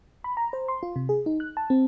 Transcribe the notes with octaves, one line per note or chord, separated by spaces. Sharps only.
B5
A#5
C5
C6
F4
C3
G#4
D#4
F#6
A5
C4